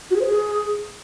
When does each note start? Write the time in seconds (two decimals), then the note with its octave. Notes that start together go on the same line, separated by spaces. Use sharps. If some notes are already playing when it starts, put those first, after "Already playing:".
0.11 F#4
0.16 G#4
0.21 C5
0.27 G#4